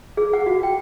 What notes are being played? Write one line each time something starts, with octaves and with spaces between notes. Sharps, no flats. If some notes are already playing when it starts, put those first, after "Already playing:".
G#4
F#5
F#4
G5